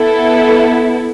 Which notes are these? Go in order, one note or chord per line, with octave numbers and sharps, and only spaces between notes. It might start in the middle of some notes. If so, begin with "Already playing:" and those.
Already playing: B3 E4 A4